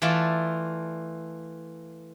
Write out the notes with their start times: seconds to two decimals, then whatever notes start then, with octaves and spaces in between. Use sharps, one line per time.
0.02 E3 A3 F4 D5 E5 A5